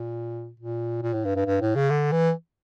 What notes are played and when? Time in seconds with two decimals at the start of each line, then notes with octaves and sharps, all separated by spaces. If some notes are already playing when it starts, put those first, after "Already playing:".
Already playing: A#2
0.60 A#2
1.03 A#2
1.14 A2
1.25 G2
1.36 G2
1.46 G2
1.61 A2
1.76 C#3
1.91 D3
2.12 E3